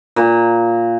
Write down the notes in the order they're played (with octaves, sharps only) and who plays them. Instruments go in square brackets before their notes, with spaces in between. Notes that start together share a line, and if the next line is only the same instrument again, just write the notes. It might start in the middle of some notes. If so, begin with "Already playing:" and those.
[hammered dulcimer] A#2